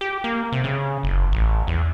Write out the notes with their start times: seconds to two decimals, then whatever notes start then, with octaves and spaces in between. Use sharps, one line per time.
0.01 G4
0.24 A#3
0.52 C3
0.64 C#3
1.03 F#1
1.32 A1
1.67 E2